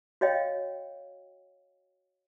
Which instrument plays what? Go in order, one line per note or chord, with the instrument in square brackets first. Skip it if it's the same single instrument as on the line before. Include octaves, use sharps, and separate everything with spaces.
[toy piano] F#4 C#5 D#5 F5 G5